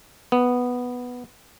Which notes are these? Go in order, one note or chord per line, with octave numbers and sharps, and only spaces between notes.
B3